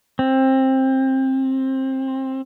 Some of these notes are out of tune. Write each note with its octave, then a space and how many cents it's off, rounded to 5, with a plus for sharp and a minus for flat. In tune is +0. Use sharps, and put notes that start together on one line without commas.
C4 +20